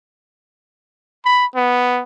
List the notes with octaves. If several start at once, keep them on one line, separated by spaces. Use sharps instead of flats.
B5
B3